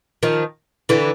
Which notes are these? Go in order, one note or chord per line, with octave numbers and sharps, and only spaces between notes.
D#3 F3
D3 E3